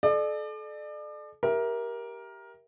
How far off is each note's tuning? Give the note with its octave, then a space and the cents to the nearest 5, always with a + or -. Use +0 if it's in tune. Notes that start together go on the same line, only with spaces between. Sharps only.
A4 -35 D5 +35
G4 +0 A#4 +15 E5 +0